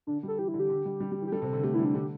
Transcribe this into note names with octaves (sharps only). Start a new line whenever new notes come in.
D3 D4
G3
A4
E3 G4
E4
D3
G4
D3
G3
G3
G3
E3
G4
G3 A4
C3
D3
A3 G4
E3 E4
G3
D4
D3 G4